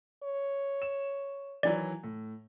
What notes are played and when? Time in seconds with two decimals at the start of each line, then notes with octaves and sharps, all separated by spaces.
0.23 C#5
0.82 E7
1.63 D#3 E3 F#3 D5
2.03 A2